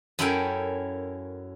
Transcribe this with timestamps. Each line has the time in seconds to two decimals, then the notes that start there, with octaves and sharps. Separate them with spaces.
0.19 F#2 C#4 E4 A4 A#4 G5